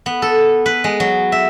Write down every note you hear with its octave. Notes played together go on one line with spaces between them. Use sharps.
B3
A4
B4
G#3
F#3
E5